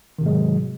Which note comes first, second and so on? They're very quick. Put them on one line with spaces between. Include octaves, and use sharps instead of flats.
D#3 C3 G#2 G#3 F#3